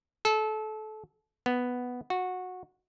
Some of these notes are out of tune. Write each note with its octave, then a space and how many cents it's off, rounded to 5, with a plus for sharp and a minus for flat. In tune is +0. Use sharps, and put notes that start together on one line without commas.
A4 -25
B3 +0
F#4 -15